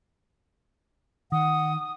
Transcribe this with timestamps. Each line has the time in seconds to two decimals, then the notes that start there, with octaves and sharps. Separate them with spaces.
1.32 D#3 F#5 D#6